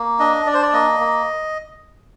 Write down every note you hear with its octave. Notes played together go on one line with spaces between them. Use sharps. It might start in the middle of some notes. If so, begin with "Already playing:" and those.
Already playing: A#3
D4 D#5
D4 D5
C5
D5
A#3 D#5
A#3